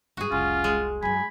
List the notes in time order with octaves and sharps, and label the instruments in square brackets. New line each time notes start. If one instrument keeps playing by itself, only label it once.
[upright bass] G2 F#3 [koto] F#4 G#4
[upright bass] F1 C2 [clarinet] C#4 [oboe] F4
[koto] G#3
[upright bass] F#2 F#3 [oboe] G#5 [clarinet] B5